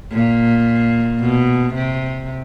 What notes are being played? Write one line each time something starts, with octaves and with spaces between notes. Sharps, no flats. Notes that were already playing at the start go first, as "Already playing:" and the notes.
A#2
B2
C3